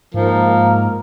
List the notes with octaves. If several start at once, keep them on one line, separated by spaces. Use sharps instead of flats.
G#2 F3 A#3 A#4